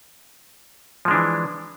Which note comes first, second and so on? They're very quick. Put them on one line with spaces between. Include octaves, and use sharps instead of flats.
F3 G#3 D4 E3